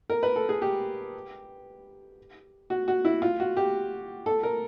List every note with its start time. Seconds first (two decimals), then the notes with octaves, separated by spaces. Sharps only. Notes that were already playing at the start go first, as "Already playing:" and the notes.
0.10 A#4
0.23 B4
0.36 A4
0.49 G#4
0.62 G4
2.70 F#4
2.88 F#4
3.05 E4
3.22 F4
3.40 F#4
3.57 G4
4.26 A4
4.43 A#4